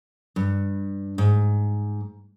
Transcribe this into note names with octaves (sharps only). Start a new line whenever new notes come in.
G2
G#2